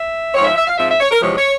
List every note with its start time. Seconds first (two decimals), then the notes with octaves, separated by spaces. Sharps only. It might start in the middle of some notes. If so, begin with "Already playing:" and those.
Already playing: E5
0.34 G#2 F3 C4 C#5
0.44 E5
0.56 E5
0.67 F5
0.77 G#2 F3 C4 E5
0.89 E5
1.00 C#5
1.11 A#4
1.22 E2 C3 F3 G#3 C#5
1.37 C#5